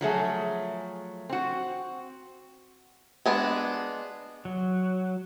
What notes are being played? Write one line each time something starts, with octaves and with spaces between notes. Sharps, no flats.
F3 F#3 A3 G#4
C4 F#4
G#3 B3 D4
F#3